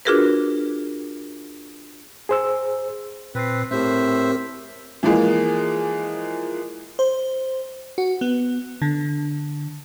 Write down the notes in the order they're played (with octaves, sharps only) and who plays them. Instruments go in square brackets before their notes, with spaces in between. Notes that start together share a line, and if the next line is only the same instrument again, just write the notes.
[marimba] D4 F4 F#4 G#4 A#4 B4
[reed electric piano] G#4 C5 E6
[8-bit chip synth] A#2 C7 [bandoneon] C4 B4
[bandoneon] A2 C5 E5 [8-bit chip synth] C4 G4 A#4
[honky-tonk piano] E3 F3 G#3 A#3
[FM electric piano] C5
F#4
B3
D3